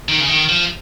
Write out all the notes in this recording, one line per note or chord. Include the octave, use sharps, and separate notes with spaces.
D#3
C#3
D#3
F3